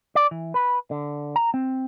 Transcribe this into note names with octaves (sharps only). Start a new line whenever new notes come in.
D5
E3
B4
D3
A#5
C4